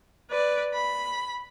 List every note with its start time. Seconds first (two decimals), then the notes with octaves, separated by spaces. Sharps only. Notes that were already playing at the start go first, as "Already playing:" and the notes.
0.30 B4 D5
0.74 B5